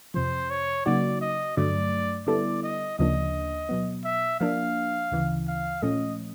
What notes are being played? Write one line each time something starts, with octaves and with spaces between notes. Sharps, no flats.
F2 C3 F3 C5
C#5
C#3 F#3 A#3 D#4 F#4 D5
D#5
G2 D3 F#3 A3 D5
D3 G3 B3 E4 A4 D5
D#5
D2 C#3 F3 A#3 D4 D#5
B2 F#3 B3
E5
F3 A#3 D4 F5
D2 C#3 E3
F5
A#2 F3 A3 C#4 D#5